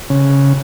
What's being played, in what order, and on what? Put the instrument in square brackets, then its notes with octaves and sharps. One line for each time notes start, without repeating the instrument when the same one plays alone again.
[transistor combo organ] C#3